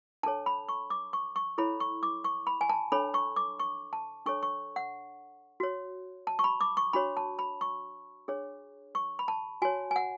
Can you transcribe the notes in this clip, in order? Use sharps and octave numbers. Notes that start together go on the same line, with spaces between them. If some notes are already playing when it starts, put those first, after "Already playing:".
D4 A4 C#5 A5
B5
C#6
D6
C#6
C#6
E4 A4 C#5 B5
C#6
D6
C#6
B5
G#5
A5
D4 A4 C#5 B5
C#6
D6
C#6
A5
D4 A4 C#5 C#6
C#6
F#5
F#4 C#5
A5
C#6
B5
D6
C#6
D4 F#4 C#5 B5
A5
B5
C#6
D4 G#4 C#5
C#6
B5
A5
F#4 C#5 G#5
G#5
F#5